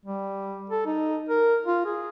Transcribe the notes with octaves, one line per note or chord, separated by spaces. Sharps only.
G3
A4
D#4
A#4
F4
G#4